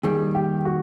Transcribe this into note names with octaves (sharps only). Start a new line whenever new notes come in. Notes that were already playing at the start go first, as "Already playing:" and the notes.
D#2 D#3 G3 G#4
G4
F#4